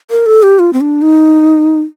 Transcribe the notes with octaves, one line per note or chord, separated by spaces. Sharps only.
A#4
A4
G4
F4
C4
D4
D#4